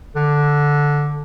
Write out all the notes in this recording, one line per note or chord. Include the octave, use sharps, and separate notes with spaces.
D3